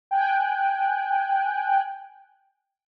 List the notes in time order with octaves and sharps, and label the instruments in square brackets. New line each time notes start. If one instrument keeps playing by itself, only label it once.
[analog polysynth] G5 G#5 F#6